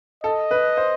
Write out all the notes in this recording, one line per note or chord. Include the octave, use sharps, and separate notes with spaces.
A4 D#5
B4
C5